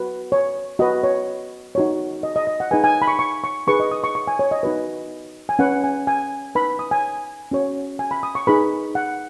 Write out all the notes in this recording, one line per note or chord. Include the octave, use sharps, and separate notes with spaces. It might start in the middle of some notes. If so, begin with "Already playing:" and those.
Already playing: F#4 B4
C#5
F#4 B4 D#5
C#5
D#4 F#4 C#5
D#5
D#5
D#5
F#5
D#4 G#4 B4 G#5
G#5
B5
C#6
C#6
C#6
D#4 G#4 B4 C#6
D#5
D#6
C#6
C#6
G#5
C#5
D#5
D#4 F#4 B4
G#5
C#4 B4 F#5
G#5
G#5
D#4 B4 B5
D#6
G#5
C#4 F#4 C#5
G#5
B5
D#6
C#6
D#4 G#4 B4 B5
F#5